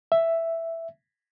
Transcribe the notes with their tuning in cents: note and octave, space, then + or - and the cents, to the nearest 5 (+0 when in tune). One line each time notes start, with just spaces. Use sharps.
E5 +5